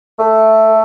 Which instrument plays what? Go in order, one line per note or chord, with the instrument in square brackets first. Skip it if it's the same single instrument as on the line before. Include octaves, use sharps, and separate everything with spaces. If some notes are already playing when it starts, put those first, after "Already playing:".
[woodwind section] A3